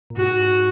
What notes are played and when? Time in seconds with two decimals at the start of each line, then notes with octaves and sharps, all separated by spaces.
0.10 A#2
0.17 G#2 F#4